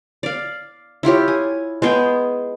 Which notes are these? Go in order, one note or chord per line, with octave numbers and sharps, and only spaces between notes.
D5 F5
E4 F4 G4 C#5
G#5
G#3 B3 G#4 G5